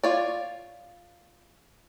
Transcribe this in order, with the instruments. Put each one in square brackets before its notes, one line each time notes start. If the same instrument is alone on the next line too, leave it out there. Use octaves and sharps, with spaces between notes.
[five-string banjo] F4 C#5 D5